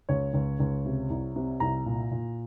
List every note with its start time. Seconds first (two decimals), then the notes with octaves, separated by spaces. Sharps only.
0.09 C#2 C#5
0.34 C#2
0.60 C#2
0.85 C3
1.10 C2
1.36 C3
1.60 C2 A#5
1.86 A#2
2.11 A#2